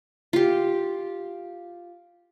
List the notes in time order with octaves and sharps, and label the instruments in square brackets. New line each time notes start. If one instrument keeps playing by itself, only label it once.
[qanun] F4 G4